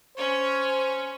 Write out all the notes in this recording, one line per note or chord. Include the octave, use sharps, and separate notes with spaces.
C#4 C5 C#5